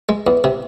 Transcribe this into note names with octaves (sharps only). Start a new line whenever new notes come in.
G#3
E2
C3